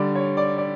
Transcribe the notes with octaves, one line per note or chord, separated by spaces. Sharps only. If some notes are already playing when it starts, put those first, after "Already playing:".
Already playing: D3 G3 D5
C#5
D5
D5